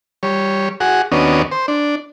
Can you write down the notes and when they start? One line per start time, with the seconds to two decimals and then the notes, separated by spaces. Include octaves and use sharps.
0.23 G3 C#5
0.80 F#4 G#4 F#5
1.12 D#2 B3 C#4 D4 F#4 D#5
1.52 C5
1.68 D4